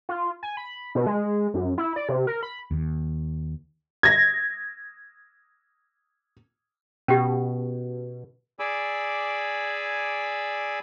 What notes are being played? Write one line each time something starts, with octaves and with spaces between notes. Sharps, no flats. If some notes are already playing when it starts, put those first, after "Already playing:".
F4
G#5
B5
B2
G#3
F#2
E4
D5
C3
A#4
B5
D#2
G#6 A#6
B2 C#4 G4
G#4 D5 G#5 B5 D6 E6